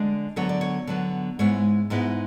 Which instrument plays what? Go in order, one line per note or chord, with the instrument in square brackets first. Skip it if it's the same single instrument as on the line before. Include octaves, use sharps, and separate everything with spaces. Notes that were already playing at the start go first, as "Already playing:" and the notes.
Already playing: [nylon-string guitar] D3 G#3 D4 D5
D3 F#3 B3 C#5
D5
C#5
D3 F#3 B3
G#2 G#3 B3 E4 C#5
G#2 G#3 B3 E4